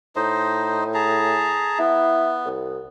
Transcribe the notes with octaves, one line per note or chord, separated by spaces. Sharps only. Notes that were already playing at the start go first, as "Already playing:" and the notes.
A2 D#4 C5 D#5
G#4 A5 A#5
B3 E4
C2